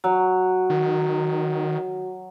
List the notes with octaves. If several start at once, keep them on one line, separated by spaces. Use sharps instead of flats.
F#3 F#4
D#3